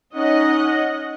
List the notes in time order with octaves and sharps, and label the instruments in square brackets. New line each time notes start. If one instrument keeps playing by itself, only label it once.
[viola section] C#4 D#5 F#5 [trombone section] D#4